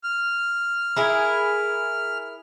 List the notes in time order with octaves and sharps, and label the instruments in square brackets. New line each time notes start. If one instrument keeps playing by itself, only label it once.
[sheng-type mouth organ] F6
[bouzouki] E4 G#4 A#4